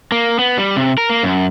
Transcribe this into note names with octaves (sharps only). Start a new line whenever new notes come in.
A#3
B3
G3
C3
A#4
A#3
F#2